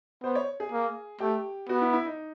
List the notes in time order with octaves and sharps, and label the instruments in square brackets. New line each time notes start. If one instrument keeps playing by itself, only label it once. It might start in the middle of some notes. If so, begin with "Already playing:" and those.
[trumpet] B3 [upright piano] C5
[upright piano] C#5
G#4
[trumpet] A#3
[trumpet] A3 [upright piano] G4
[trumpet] B3 [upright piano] F#4
[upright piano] E4
E4
D#4